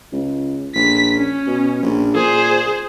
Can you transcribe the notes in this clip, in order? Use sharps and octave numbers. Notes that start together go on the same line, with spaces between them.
C#2
A#1 B6
C#4
B2
A#1
A#2 G#4 C5